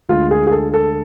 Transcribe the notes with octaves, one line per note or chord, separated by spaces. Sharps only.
D2 D3 G#3 F4
G#4
G#4
A4
A4